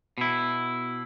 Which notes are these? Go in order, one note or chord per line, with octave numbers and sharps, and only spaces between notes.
B2 E4